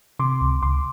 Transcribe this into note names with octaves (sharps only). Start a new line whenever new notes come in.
C3 C6 D6
C#2
C#2 C6 D6